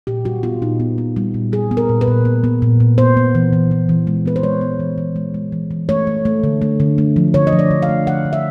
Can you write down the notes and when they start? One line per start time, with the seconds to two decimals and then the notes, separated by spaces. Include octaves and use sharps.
0.07 A#2 G4
0.25 G3 F#4
0.43 B3 F4
0.62 A#2 D#4
0.80 B3
0.98 B3
1.16 G3
1.34 A#2
1.52 G3 G#4
1.71 B3
1.77 A#4
1.89 A#2
2.01 B4
2.07 A#2
2.25 B3
2.44 B3
2.62 A#2
2.80 A#2
2.98 B3 C5
3.17 B3
3.35 E3
3.53 E3
3.71 E3
3.89 E3
4.07 G#3
4.26 B3 B4
4.36 C5
4.43 G#3 C#5
4.61 B3
4.80 E3
4.98 E3
5.16 G#3
5.34 G#3
5.52 E3
5.71 E3
5.89 A3 C#5
6.07 A3
6.25 A3
6.44 D3
6.62 A3
6.80 D3
6.98 A3
7.16 F3
7.34 D3 C#5
7.47 D#5
7.52 F3
7.59 D5
7.71 D3
7.82 F5
7.89 A3
8.07 F3 F#5
8.25 D3
8.33 E5